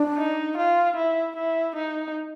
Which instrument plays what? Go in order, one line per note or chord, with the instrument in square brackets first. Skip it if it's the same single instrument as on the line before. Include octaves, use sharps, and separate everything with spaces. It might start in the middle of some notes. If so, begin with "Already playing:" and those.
Already playing: [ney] D4
[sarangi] D#4
F4
E4
E4
D#4